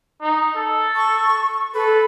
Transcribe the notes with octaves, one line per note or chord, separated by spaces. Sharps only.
D#4
A4
C#6
A4 B4